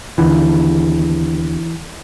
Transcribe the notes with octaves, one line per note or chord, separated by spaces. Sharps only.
D#2 D3 E3